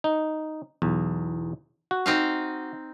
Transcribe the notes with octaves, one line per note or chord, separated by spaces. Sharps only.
D#4
B1 E2
F#4
C4 D#4 F5